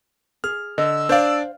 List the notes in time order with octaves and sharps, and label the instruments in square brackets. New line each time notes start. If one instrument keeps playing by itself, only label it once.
[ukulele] G#4 [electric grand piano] F6
[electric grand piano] D3 [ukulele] D#5 [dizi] E6
[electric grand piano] D4 D5 [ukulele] C5 F5